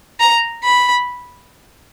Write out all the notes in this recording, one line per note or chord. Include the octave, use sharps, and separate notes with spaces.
A#5
B5